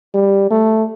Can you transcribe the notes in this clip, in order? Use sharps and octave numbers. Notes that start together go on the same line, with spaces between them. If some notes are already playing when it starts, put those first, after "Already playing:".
G3
A3